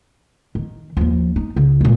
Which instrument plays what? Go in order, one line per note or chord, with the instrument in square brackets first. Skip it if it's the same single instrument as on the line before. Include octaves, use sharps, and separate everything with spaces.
[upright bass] D#3
D#2 F3
D#4
C#2 C#3
A#2 G#3